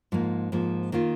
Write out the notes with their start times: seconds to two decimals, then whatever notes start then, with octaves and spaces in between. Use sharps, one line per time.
0.12 G#2 F3 A#3
0.52 G#2 F3 A#3
0.92 D#3 A#3 F4